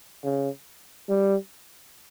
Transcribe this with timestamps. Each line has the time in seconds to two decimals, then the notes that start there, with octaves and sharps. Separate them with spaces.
0.24 C#3
1.09 G3